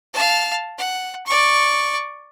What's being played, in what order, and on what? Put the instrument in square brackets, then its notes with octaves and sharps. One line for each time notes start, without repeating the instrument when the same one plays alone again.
[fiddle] F5 A5
F#5
D5 C#6